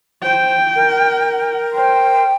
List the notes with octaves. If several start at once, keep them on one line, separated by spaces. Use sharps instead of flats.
C5 G5
A#4
C5 G5